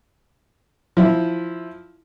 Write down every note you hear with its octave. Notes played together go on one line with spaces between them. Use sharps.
F3 E4